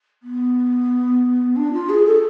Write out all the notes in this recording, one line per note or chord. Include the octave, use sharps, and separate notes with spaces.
B3
D4
F4
G#4
A4